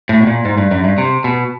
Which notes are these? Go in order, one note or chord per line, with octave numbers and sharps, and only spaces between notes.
A2
B2
A#2
G#2
G2
F#2
G2
C3
B2